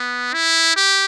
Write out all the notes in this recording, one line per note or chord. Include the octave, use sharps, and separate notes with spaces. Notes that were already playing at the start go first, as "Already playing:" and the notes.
Already playing: B3
E4
G4